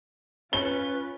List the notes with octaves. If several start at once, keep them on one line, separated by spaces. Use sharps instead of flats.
C#4 F4 B4 G7